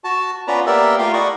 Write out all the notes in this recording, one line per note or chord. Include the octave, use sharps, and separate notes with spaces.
F#4 A5
B3 C#4 F4 B4 D5 A#5
A#3 B3 G4 A#4 D5 E5
A3 F4 G4 A#4 F5
E4 D5 D#5 F#5 C#6